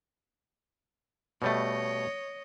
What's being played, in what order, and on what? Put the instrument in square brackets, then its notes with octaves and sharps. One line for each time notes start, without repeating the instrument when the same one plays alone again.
[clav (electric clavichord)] B2 G3 A3 [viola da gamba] C#5 D#5